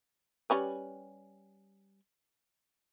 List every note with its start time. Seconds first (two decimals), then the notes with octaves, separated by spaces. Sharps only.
0.50 G3 C#4 B4